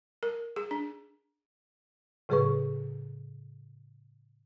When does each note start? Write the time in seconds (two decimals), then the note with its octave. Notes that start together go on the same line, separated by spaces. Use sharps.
0.23 A#4
0.56 G#4
0.71 D4
2.29 A2 C#3 F#3 G#4 B4 C#6